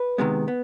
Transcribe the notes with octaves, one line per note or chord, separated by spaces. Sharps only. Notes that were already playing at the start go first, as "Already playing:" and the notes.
Already playing: B4
C3 D#3 G#3 B3
B3